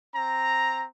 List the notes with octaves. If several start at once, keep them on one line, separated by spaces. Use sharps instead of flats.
C4 A#5